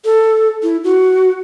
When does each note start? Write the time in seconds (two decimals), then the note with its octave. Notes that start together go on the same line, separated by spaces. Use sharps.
0.05 A4
0.63 E4
0.84 F#4